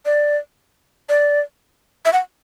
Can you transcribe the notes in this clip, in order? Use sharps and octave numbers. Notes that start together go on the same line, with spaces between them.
D5
D5
E5
F#5